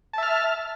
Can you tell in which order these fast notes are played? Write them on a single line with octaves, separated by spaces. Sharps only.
A5 E5 F6